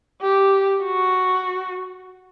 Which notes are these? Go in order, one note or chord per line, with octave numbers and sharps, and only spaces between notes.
G4
F#4